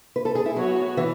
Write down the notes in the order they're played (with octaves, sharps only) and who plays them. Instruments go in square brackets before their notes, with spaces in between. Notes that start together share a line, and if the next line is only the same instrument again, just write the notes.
[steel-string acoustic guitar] B4
A4
G#4
E4
[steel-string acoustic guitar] F#3 [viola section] B3 F#4 C#5
[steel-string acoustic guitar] E3